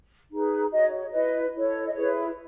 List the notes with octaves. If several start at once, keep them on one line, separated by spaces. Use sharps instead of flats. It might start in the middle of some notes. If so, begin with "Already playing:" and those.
D#4 G#4 B4
F#4 C#5 D#5
E4 B4 D#5
E4 A4 C#5
D#5
E4 G#4 B4 C#5